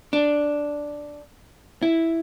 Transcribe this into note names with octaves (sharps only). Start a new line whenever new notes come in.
D4
E4